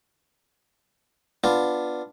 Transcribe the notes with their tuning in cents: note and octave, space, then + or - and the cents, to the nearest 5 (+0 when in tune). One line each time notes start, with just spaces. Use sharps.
B3 +0 D4 +5 F4 +0